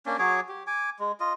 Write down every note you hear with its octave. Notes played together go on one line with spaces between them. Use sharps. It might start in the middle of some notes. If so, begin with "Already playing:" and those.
A#3 C#4 D4
F#3 G#4 C#5 D6
G4
G#5 D6
G#3
F4 D#5